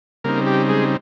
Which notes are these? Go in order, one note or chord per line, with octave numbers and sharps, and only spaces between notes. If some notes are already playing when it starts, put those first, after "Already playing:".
C#3 G3 A#3 C4 D#4 A#4
G4
G#3 G#4